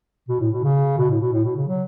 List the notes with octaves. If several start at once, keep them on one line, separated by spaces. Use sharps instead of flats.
B2
A2
B2
C#3
B2
A2
B2
A2
B2
C#3
F#3